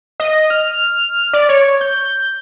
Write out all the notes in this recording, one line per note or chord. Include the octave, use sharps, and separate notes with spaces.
D#5
F6
D5
C#5
G6